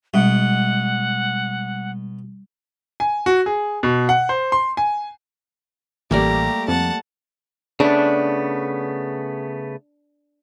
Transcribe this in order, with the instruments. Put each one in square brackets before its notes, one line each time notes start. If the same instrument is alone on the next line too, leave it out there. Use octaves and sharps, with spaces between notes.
[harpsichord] B2 [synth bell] G3 [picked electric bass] G#3 [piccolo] F#5
[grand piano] G#5
F#4
G#4
B2
F#5
C5
C6
G#5
[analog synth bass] A1 [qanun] G3 A3 A#3 [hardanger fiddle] G4 A#5
[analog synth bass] F2 [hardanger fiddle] F#5 A5
[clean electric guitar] C#3 A3 B3 [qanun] D4